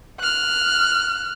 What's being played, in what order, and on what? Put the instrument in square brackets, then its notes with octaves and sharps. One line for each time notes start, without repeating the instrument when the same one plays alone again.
[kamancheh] F6 F#6